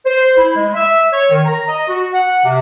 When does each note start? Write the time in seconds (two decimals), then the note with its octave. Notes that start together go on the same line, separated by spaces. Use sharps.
0.06 C5
0.37 E4
0.56 G#3
0.75 E5
1.13 C#5
1.31 D#3
1.46 A#5
1.68 D#5
1.88 F#4
2.14 F#5
2.45 C3